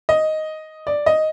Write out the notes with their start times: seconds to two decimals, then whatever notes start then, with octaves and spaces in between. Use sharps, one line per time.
0.09 D#5
0.87 D5
1.06 D#5